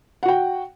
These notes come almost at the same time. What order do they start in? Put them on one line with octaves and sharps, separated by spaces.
F#5 F#4 G5